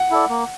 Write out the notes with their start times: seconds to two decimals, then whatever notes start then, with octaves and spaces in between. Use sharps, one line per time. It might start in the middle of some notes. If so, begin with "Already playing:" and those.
Already playing: F#5
0.11 E4 A4 D5
0.29 A#3